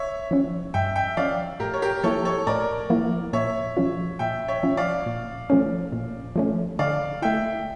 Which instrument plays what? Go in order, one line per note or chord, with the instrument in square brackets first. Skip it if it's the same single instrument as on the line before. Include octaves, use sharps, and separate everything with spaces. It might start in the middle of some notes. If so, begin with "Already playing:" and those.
Already playing: [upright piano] C#5 E5
[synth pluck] F3 C#4
[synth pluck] G2 [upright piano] E5 G5
[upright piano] E5 G5
[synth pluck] F3 C#4 [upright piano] D5 F5
[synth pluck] A2 [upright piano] G4 A#4
[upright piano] C#5
G4 A#4
[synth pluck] F3 A#3 E4 [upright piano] A4 C#5
[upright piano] A4 C#5
[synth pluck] A2 [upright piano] A#4 D5
[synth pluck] F3 A#3 E4
[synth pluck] A#2 [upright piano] C#5 E5
[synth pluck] F3 C#4 F4
[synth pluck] A#2 [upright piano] E5 G5
[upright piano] C#5 E5
[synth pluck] F3 C#4 F4
[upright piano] D5 F5
[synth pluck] A#2
F3 A3 C#4
A#2
F3 A3 C#4
[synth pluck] D3 [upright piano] D5 F5
[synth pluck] A3 E4 [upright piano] E5 G5